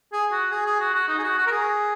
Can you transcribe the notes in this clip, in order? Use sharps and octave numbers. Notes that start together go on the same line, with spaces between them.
G#4
F#4
G#4
G#4
F#4
F#4
D#4
G#4
F#4
F#4
A#4
G#4